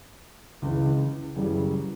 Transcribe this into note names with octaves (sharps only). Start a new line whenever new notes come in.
C#2 C#3 E3
F#2 C#3 E3 G3